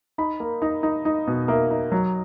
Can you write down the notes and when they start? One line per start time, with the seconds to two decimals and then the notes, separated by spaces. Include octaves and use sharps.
0.18 D#4 B5
0.40 A#3
0.62 D#4 A#5
0.83 D#4
1.05 D#4
1.27 B2
1.48 A#3 E5
1.71 D#4
1.92 F#3